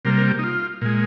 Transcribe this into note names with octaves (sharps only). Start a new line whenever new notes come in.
C3 G3 A#3 A#4
A#4
G4
D#4
F4
A#2 G#3